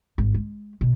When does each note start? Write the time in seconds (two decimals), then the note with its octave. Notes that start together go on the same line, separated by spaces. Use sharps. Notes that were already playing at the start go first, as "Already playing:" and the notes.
0.18 G#1
0.34 G#3
0.81 B2